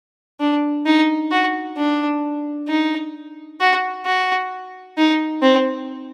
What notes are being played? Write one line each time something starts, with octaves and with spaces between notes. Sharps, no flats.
D4
D#4
F#4
D4
D#4
F#4
F#4
D#4
C4